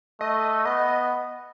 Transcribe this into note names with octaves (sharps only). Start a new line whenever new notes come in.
A3 D#5
B3 D#5